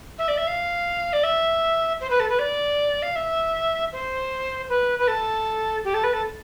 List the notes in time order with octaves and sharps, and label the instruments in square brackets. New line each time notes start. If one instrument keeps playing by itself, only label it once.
[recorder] E5
D5
E5
F5
D5
E5
C5
B4
A4
B4
D5
F5
E5
C5
B4
B4
A4
G4
A4
B4
A4